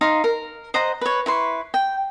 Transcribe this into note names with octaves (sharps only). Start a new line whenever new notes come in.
D#4 F5 C6
A#4
C5 D#5 F#5 A#5
B4 C#5
E4 B4 C6 C#6
G5